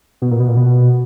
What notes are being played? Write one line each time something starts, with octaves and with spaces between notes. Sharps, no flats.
B2
A#2
B2
A#2
B2